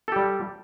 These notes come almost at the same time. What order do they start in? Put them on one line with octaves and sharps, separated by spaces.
A4 G4 G3